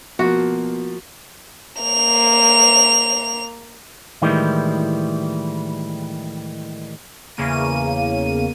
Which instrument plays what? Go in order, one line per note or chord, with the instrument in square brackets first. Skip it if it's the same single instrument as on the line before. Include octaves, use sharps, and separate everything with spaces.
[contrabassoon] B2 [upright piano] F3 A#3 [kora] F#4
[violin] A#3 F7
[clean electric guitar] A2 D#3 E3 G3 G#3
[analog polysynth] E2 C#3 A#3 D#7